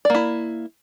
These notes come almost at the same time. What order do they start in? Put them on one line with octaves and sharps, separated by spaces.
D5 A#3 E4